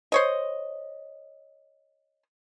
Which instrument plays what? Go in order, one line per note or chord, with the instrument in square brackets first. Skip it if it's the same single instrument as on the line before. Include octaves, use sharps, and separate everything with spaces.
[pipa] C5 C#5 D#5